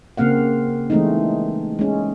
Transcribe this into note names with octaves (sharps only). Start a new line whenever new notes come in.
C#3 A#3 C4 F5 F#5
E3 G#3 A3 C4 D#4
G#3 C#4